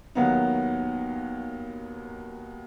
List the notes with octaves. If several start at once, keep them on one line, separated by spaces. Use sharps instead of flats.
D#2 D#3 F#3 B3 D#4